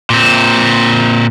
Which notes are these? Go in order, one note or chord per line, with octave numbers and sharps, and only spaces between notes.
A#2 C4